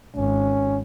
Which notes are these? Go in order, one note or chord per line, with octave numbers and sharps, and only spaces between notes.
G#1 C#4